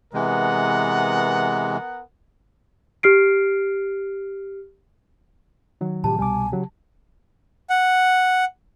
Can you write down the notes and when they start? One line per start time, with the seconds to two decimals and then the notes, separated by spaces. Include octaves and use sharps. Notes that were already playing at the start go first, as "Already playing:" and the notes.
0.14 C3 E3 G#3 B3 A#4 F#5
3.03 G4 F6 C7 D7
5.81 D#3 F#3
6.04 A2 C3 F3 G4 A5
6.19 C2 B2 G3 G#5 D6
6.52 C#3 F#3 G4
7.70 F#5